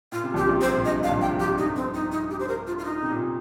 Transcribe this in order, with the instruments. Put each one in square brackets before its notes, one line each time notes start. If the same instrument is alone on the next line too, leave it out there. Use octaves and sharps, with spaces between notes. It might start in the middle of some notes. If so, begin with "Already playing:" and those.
[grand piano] A#2 [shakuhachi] F4
[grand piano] C3
[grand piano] A#1 A#2 [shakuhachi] G4
[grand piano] C2 C3
[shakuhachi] C5
[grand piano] A#2
[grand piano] G2 [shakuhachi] D#5
[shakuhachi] F5
[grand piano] A#1 A#2
[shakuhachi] G5
[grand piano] G2
F2
[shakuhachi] G4
[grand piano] G2 [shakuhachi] D#4
[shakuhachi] C4
D#4
D#4
G4
C5
A#4
F4
F4
D#4
[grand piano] C3
A#2